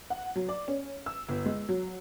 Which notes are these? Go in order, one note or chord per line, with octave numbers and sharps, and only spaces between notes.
F#5
F#3
D5
C#4
E6
G1
G#3
F#3